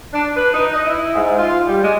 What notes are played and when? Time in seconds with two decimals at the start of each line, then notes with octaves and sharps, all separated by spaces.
0.13 D4
0.36 B4
0.54 D#4
0.74 D#5
0.86 E4
1.15 G#2
1.38 F4
1.68 G3
1.84 G#3